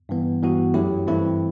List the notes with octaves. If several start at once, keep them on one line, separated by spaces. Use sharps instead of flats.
G2 E3 B3
G2 E3 B3 F#4
F#2 F#3 A3 E4 G4
G2 E3 A3 C4 E4